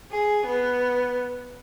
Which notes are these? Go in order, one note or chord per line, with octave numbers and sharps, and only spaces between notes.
G#4
B3